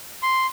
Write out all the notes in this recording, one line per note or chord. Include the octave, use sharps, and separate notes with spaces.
C6